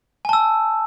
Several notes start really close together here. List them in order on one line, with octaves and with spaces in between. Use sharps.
G#5 A5 E6